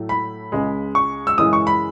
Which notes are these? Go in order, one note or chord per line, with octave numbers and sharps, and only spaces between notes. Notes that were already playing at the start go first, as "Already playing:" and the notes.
Already playing: A2 F#3 A3
B5
C#2 C#3 G#3
C#6
E6
F#2 C#3 E3 G#3 D#6
C#6
B5